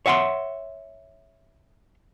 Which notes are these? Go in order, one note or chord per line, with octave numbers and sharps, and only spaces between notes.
C#5 E5 F#5 B5 C6